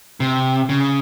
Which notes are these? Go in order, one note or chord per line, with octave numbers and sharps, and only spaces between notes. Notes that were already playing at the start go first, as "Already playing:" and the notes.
C3
C#3